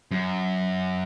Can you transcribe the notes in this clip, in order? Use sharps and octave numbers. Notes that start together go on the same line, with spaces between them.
F#2